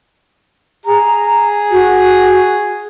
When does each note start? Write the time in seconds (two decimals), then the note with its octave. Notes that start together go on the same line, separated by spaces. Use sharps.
0.85 G#4 A#5
1.71 F#4